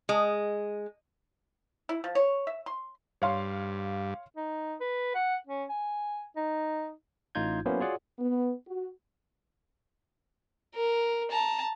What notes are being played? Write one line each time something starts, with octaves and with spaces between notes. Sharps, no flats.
G#3
E4
F3
C#5
E5
C6
G2 C#5 F5 C6
D#4
B4
F#5
C#4
G#5
D#4
A1 A2 D#4 F4 G6 G#6
F#3 A#3 B3 C#4 E4 C5
F4 F#4 G#4 C#5 D5 F#5
B3
F#4
A#4
A5 A#5